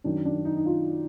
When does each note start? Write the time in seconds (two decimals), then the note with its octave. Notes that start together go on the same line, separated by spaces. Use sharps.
0.04 F#2 D#3 D4
0.25 D4
0.45 D#4
0.57 D#4
0.66 F4